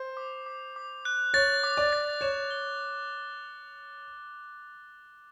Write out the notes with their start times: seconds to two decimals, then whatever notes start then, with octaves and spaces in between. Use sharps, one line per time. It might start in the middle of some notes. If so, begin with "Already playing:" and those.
Already playing: C5
0.17 D6
0.46 D6
0.76 D6
1.05 F#6
1.34 C#5 A6
1.63 D6
1.77 D5
1.93 A6
2.21 C#5 E7
2.51 G7